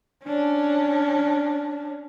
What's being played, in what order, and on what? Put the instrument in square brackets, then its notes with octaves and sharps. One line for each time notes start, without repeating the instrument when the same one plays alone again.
[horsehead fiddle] C#4 D4